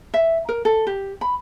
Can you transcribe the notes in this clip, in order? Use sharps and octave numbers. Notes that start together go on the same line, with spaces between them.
E5
A#4
A4
G4
B5